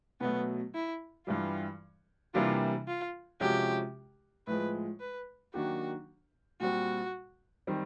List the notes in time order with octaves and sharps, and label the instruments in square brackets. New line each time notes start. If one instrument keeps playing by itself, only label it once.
[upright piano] B2 F#3 A3 [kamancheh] B3
[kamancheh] E4
[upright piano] G2 E3 G3 [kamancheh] F4
[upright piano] C3 E3 G3 A#3 D4 [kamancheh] F4
[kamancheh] F4
[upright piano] C3 F3 G#3 C#4 F#4 [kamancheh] G4
[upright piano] A2 F3 G#3 [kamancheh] B4
[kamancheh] B4
[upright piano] D#3 F#3 A#3 D4 G4 [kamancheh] F#4
[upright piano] A#2 G3 C4 [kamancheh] F#4
[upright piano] D#3 G3 C4